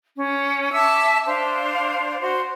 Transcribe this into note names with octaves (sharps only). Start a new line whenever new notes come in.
C#4
E5 A5 D6 E6
D4 C5 F5
F#4 C5